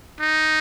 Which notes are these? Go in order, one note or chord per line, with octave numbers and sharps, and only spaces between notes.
D#4